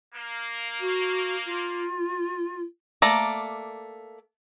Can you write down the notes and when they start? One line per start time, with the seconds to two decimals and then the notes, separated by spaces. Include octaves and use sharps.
0.14 A#3
0.79 F#4
1.46 F4
3.02 A3 A#3 D5 A#5